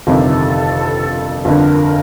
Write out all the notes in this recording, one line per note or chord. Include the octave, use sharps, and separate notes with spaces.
G1 F2 C3 D#3 A4
G1 F2 D3 A#4